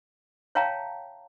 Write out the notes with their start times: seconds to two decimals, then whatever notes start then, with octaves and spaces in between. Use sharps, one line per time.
0.55 C#5 E5 F5 G5 A5 A#5